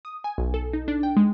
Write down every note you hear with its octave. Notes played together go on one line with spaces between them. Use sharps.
D#6
G#5
B1
A4
D#4
D4
G5
G#3